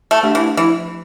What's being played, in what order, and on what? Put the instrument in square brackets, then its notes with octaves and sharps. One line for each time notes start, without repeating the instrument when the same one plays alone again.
[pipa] A3
[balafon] A3 D4 G4
[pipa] E3
[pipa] E3 [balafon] F3